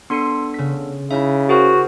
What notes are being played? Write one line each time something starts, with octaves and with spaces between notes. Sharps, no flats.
B3 D4 A4 C6 C#7
C#3 B6
C#3 D#4 E4 E5
F#4 G#4 A#4 C5